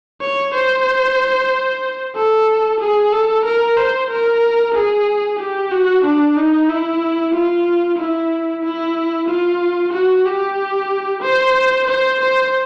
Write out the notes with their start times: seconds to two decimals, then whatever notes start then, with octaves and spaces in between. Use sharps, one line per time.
0.21 C#5
0.54 C5
2.15 A4
2.80 G#4
3.12 A4
3.45 A#4
3.77 C5
4.10 A#4
4.74 G#4
5.39 G4
5.72 F#4
6.04 D4
6.36 D#4
6.69 E4
7.33 F4
7.99 E4
8.63 E4
9.28 F4
9.93 F#4
10.25 G4
11.23 C5
11.87 C5
12.20 C5